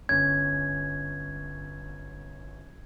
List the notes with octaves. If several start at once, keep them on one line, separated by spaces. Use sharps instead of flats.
G1 C#4 G#6